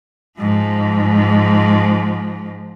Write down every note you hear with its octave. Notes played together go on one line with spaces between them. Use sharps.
G#2 F3